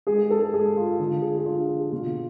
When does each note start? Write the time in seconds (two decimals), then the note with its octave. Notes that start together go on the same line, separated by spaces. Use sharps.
0.07 G#3 G#4
0.30 A4
0.54 G#3 G#4
0.77 F4
0.99 D3 F4
1.22 G#4
1.38 G#4
1.46 D4 F4
1.69 G#4
1.92 B2 F4